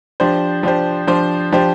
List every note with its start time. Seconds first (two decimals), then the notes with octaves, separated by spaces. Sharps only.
0.20 F3 D4 G4 C5
0.63 F3 D4 G4 C5
1.07 F3 D4 G4 C5
1.52 F3 D4 G4 C5